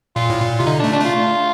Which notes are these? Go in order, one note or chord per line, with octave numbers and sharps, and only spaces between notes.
A#2 F4
A2
A#2
C3 F4
D3 D#4
D4
A3
D4
A3 F4